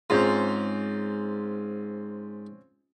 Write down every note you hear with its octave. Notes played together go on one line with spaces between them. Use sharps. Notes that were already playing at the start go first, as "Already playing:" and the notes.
G#2 C4 C#4 F4